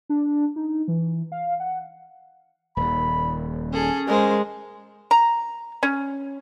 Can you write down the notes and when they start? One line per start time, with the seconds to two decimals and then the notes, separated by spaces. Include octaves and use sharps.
0.09 D4
0.56 D#4
0.88 E3
1.32 F5
1.60 F#5
2.77 D#1 D#2 B5
3.73 C#4 G#4 A4
4.08 G#3 A#4 C5
5.11 A#5
5.83 C#4